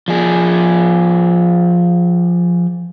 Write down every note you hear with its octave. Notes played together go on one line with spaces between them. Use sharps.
F3 G#4